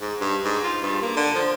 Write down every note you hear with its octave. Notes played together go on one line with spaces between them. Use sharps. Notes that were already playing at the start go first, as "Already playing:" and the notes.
G#2
G2
G#2
F4
G2
A#3
D3
F3